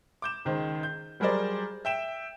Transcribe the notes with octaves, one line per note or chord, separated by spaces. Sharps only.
D6 G6 E7
C#2 D#3 C5
G6
F#3 G3 G#4 A#4 C5 D5
E5 G5 E7